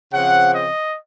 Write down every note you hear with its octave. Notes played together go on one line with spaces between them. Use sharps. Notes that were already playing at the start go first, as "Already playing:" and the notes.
C#3 F3 C4 F#5
D#5